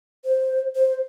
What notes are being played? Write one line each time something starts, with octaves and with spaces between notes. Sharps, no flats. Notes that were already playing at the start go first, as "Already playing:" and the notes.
C5
C5